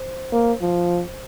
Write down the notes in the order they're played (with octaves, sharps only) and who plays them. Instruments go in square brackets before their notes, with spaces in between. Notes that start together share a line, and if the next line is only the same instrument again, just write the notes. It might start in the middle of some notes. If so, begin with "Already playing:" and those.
Already playing: [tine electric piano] C5
[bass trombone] A#3
F3